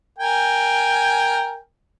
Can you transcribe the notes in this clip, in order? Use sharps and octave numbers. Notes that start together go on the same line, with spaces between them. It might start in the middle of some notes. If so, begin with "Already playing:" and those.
A#4 G5 G#5